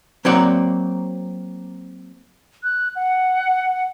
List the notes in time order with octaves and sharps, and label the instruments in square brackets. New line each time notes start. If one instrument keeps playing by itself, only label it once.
[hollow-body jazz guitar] F#3 A#3 C4 D5 F#5
[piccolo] F#6
F#5